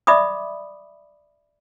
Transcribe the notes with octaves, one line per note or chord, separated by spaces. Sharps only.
D5 E5 B5 D6 D#6